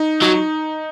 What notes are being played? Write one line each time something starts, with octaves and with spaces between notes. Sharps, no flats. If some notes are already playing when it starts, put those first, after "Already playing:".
Already playing: D#4
F#3 D#4